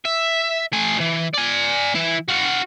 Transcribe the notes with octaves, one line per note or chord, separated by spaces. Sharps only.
E5
A3 G#5
D2 E3
D5 G#5
E3 E4
F#4 F5